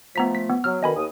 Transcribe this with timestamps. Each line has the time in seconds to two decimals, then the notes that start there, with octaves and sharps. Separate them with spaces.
0.16 F3 A3 B3 A#5 B6
0.35 B6
0.50 B3
0.64 F#3 E6 F6
0.83 B2 D3 D#3 D#5 G#5 B5
0.96 D#2 D#6